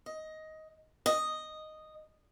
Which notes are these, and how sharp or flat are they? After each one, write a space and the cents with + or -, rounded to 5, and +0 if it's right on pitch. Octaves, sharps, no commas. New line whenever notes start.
D#5 +10
D#5 -5